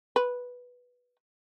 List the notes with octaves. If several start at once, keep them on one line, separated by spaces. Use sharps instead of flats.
B4